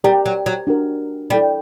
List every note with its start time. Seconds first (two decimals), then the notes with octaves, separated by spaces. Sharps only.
0.04 G3 G4 A#4 D5 G5 A#5
0.26 F#3
0.46 F#3
0.67 D4 F#4 A#4
1.30 G3 E4 A4 D5 G5 B5